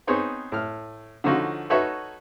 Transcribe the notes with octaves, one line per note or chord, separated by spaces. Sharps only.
B3 C4 D#4 G#4 C5 C#5
A2 F6
D3 F3 C#4 D#4 F4 F#4
D#4 F#4 A4 B4 C#5 E5